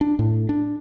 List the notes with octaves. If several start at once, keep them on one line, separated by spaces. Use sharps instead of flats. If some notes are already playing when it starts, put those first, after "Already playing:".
D4
A2
D4